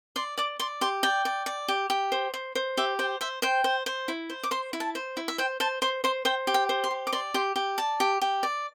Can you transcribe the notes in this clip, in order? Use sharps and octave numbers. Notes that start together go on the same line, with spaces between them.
D5 C6
D5 D6
D5 C6
G4 C6
D5 G5
D5
D5
G4
G4
C5
C5
C5
G4 E5
C5 G5
C5 E5
C5 G5
C5
C5
E4
C5
D6
C5 C6
E4
A5
C5
E4
E5
C5 G5
C5 A5
C5 C6
C5 C6
C5 G5
G4
G5
C5
C6
G4
D6
D5 C6
G4 C6
G4
D5 A5
G4
G4
D5